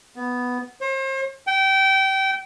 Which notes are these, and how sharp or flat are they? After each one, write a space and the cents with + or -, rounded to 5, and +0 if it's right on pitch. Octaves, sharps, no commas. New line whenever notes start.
B3 +0
C5 +40
G5 -25